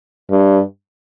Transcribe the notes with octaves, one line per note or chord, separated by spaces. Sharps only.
G2